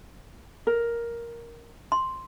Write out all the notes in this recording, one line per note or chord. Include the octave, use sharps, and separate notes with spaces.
A#4
C6